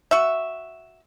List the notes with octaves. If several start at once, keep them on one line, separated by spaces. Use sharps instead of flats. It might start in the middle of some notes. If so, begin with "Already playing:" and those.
F#4 E5